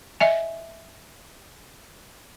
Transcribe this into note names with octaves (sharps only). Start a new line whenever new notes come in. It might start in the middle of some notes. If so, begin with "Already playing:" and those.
D#5 E5 G#5